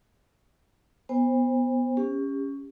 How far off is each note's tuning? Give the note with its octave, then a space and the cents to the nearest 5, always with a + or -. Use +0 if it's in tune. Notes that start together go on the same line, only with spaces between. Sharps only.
B3 +0 C5 +10 G#5 -45
C#4 +5 G4 +30